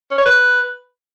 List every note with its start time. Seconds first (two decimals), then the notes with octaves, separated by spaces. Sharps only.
0.11 C#4
0.18 C#5
0.25 B4